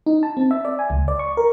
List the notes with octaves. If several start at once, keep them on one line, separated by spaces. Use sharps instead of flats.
D#4
A5
C4
E5
D5
G#5
C#2
D5
C#6
A#4